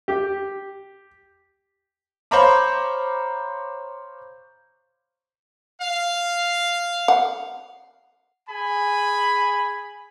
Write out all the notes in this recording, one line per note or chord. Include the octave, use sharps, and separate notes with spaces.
G4
C5 C#5 F5 A#5 B5 D6
F5
F#5
G#4 G#5 B5